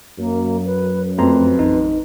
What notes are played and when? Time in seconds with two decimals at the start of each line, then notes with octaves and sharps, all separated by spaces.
0.19 F#2 A#3
0.66 B4
1.18 F2 A3 B4 A#5 C6
1.59 A1 D#4